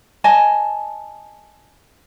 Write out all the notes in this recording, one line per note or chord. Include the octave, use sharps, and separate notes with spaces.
D#5 G#5 A5